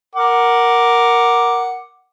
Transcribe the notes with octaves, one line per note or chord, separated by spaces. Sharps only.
A#4 F#5 D6